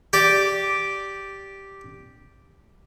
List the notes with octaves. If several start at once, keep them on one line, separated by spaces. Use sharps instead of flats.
G4 D5